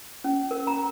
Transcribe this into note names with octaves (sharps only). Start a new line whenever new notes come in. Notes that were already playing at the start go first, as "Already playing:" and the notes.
C#4
A#4
A#5